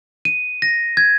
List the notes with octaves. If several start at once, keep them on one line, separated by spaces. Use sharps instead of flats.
D#7
A#6
G#6